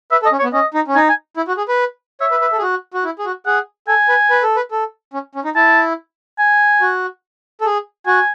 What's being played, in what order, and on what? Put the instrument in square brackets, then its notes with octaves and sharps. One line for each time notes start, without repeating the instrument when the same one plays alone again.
[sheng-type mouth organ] B4 [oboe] E5
[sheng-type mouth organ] A4
[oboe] D#5
[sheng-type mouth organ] C#4
[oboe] C#5
[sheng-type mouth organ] B3
[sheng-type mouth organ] C#4 [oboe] D#5
[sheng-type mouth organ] D#4
C#4
[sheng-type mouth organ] D#4 [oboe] G#5
[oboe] G#5
[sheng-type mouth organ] E4
F#4
G#4
B4
[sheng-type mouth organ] C#5 [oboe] E5
[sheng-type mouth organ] B4
B4
A4
G#4
F#4
F#4
E4
G#4
F#4
[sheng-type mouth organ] G#4 [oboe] F#5
[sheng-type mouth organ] A4 [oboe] G#5
[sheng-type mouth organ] B4
B4
A4
B4
A4
C#4
C#4
D#4
[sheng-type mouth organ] E4 [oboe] A5
[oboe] G#5
[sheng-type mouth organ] F#4
A4
G#4
[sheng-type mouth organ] F#4 [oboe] G#5